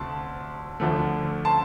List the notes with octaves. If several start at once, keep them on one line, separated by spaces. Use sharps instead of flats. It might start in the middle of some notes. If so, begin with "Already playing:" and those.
Already playing: D2 C3 A3 A5 C6
D2 D3 F3 A3
A5 C6